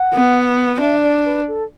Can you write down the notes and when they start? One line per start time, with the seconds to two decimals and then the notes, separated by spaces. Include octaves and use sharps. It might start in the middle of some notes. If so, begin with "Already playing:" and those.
Already playing: F#5
0.14 B3
0.80 D4 E5
1.02 D5
1.25 B4
1.48 A4